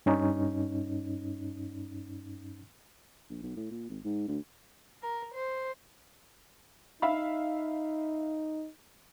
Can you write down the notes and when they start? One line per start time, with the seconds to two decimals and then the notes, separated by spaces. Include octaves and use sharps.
0.06 G2 C#4 D#4
3.30 A#1
3.43 B1
3.57 A2
3.71 A#2
3.90 G#1
4.05 G#2
4.28 D2
5.02 A#4
5.34 C5
7.02 D#4 E5 F5 B5